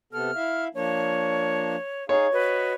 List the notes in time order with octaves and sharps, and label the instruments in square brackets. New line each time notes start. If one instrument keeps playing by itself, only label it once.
[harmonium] C3 B3 A4 [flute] F6
[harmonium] E4 E5 F5
[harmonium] F3 A#3 D4 [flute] C#5
[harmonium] D#4 G#4 F5 [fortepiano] C#5
[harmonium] F#4 D#5 [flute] B4